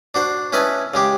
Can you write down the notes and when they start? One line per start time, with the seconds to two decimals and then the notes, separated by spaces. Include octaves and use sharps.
0.14 D4 F#4 C5
0.53 C#4 E4 B4 D#5 G#5 A5
0.94 C#3 G#3 G4